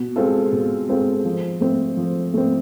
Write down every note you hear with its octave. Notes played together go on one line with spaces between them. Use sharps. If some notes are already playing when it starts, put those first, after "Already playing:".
Already playing: B2
G#3 C4 F4 A4
B2
G#3 C4 F4 A4
F3
A3 C4
F3
A3 C4